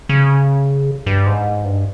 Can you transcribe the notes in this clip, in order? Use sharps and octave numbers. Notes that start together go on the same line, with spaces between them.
C#3
G2
G#2
G2